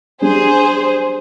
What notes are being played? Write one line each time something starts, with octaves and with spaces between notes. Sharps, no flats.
G3 D4 G4 G#4 C5